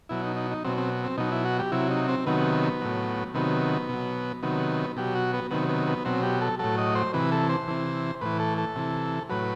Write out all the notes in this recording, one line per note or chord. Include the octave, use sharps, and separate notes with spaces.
B2 F#3 E4
D#4
D#4
D#4
B2 F#3 C4
C4
C4
B2 F#3 D#4
E4
F#4
G4
C3 F#3 E4
D#4
C4
C3 D#3 F#3 B3
A2 F#3
C3 D#3 F#3 B3
B2 F#3
C3 D#3 F#3 B3
B2 F#3 G4
F#4
B3
C3 D#3 F#3 B3
B3
B3
B2 F#3 C4
G4
A4
A2 F#3 A4
D#5
C5
C3 E3 B4
A4
C5
C3 E3
A2 E3 B4
A4
A4
C3 E3
A2 F#3 B4